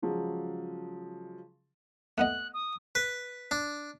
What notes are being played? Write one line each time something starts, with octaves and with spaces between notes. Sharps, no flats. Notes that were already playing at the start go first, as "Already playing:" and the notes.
C#3 F3 F#3 G#3
A3 B3 D#5 F#6
D#6
B4
D4